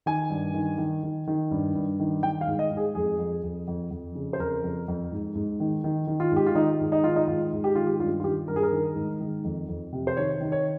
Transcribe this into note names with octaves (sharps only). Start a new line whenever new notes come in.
D#3 G#5
G2
D#3
D#3
D#3
D#3
G2
G2
D#3
D#3 G5
F5
G#2
D#5
G#2
G#4
F2 G#4
F2
F2
F2
F2
C#3
C5
F2 A#4
F2
F2
G#2
G#2
D#3
D#3
D#3
F4
G#2 G4
F4
D#3 D#4
G#2
D#4
D#3 F4
D#4
G#2 F4
G#2
G4
D#3 F4
G4
G2 F4
F4
D#3 G4
G2 A#4
G#4
A#4
D#3
G#2
D#3
F2
F2
C3
C5
D#3 C#5
D#3
C#5